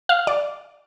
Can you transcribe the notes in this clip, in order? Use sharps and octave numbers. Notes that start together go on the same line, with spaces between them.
F5
D5